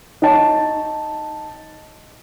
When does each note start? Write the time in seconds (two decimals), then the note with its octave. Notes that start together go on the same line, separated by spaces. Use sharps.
0.22 D#4 C#5 G5 A5